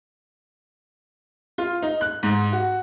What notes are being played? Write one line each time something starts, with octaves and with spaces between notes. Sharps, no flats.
F4
D#4
F#6
G#2
F#4